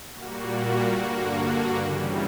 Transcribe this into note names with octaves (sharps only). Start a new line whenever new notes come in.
A#2 G3 A#3 F#4
G2 D3 A#3 F#4
C#3 E3 G3